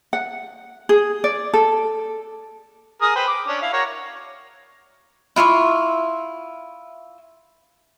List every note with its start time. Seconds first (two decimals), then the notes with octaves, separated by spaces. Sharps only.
0.13 F#5
0.89 G#4
1.24 D5
1.54 A4
3.02 G#4 A#4 D#6
3.15 B4 C5 G5
3.27 D6
3.48 C#4 D4
3.62 E4 F5
3.73 F#4 A#4 C#5
5.36 E4 F4 E5 C#6